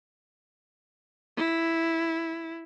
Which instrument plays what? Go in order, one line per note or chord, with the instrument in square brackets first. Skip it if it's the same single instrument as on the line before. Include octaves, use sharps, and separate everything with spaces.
[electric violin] E4